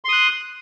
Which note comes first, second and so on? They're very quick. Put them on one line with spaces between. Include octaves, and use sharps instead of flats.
C6 D#6 F#6